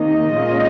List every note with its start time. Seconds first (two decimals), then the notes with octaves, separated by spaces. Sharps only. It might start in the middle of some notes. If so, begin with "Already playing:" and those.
Already playing: C3 D#3 A#3 D#4 D#5
0.33 A#2 G#3 C#4 F4